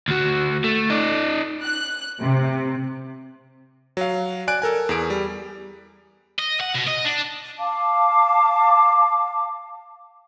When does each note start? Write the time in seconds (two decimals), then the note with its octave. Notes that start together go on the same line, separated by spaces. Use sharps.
0.08 D2 F#4
0.64 A3
0.90 D#4 D5
1.63 F#6
2.20 C3
3.97 F#3 F5
4.48 D5 G#5 F#6 D7
4.62 A4 A#4 G#5
4.89 E2 G#4 D7
5.10 G3
6.39 D#5
6.60 F#5
6.74 B2
6.87 D#5
7.05 D4
7.59 F5 A5 D6